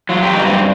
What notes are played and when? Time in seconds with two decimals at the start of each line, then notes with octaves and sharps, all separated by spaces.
0.09 F#3 F4
0.22 G4
0.34 G2 D#4
0.47 C4